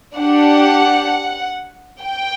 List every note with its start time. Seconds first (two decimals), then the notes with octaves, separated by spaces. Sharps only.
0.17 D4 G4 F#5
2.01 G5